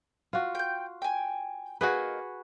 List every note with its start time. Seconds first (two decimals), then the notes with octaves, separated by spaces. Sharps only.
0.33 F4 F#4
0.55 G5 G6
1.02 G5 G#5
1.81 A#3 D#4 F#4 G#4 B4